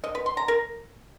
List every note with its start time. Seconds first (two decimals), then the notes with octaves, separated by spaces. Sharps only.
0.04 D#5
0.15 B4
0.26 C6
0.37 A#5
0.48 A#4